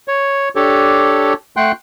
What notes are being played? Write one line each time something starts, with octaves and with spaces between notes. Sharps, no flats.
C#5
D4 G4 A4 C#5
A3 F#5 G5 C6 F#6